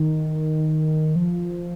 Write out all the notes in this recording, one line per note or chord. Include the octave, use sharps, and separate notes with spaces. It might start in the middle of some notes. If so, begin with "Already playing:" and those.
Already playing: D#3
F3